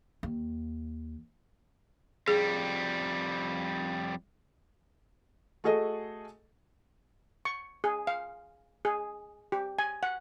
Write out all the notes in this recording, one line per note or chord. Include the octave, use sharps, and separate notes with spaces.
D#2
F2 G3 G#4
A3 F#4 G#4 A4 D#5
C#6
G#4
F5
G#4
G4
G#5
F#5